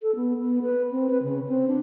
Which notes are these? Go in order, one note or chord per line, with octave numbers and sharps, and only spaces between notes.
A4
B3
B3
B4
C4
B4
C#3
C4
D4